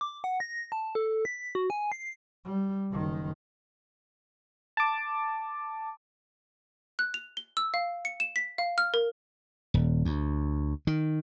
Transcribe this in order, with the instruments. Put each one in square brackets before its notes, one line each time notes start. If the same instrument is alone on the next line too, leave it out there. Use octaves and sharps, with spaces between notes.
[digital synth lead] D6
F#5
A#6
A5
A4
B6
F#4
G#5
C7
[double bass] G3
F#1 D#3
[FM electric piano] A5 D6
[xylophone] F#6
F7
G7
E6
F5
C#7
E7
B6
F5
F6
A#4
[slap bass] D#1
D2
D#3